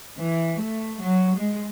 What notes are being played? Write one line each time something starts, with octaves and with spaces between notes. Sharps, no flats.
E3
A3
F#3
G#3